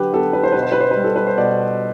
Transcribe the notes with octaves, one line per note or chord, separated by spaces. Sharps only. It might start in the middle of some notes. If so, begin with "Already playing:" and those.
Already playing: D3 F#3 G4 B4
B3 A4
B4
C5
B2 B4
C5
B4
C5
G3 B4
A4
B4
C5
B2 D5